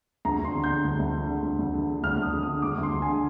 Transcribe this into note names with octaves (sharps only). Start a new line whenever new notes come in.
D2 A#5
D2
C6
D3
D3 G6
D2
D2
D3
D3
D2
D2
D3
D3
D2 F6
D2
D#6
D3
D#6
D3
D2 D6
D2
C6
D3
G#5
D3